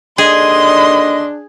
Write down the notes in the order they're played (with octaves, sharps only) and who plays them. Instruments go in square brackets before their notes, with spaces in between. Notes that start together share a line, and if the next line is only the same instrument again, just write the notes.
[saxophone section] D#2 D3 D#5 [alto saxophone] D4 [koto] G#4 [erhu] C6